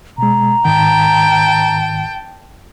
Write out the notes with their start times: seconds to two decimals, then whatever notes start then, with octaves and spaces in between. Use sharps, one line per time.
0.18 B2 G#3 A#5
0.65 G#2 D#3 G5 A5